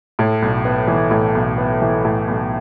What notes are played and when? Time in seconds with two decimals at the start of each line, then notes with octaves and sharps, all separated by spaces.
0.19 A2
0.42 B1
0.65 B3
0.88 E3
1.11 A2
1.35 B1
1.58 B3
1.82 E3
2.05 A2
2.28 B1